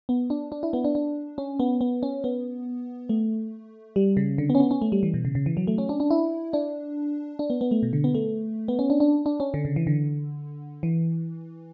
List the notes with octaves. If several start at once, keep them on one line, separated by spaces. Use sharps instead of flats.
B3
D4
D4
E4
B3
D4
D4
C#4
B3
B3
C#4
B3
A3
G3
C#3
D3
B3
C#4
B3
C#4
A3
G3
E3
B2
C#3
C#3
E3
F#3
A3
C#4
D4
D4
E4
D4
D4
B3
B3
A3
B2
D3
B3
A3
B3
C#4
D4
D4
D4
C#4
D3
C#3
E3
D3
E3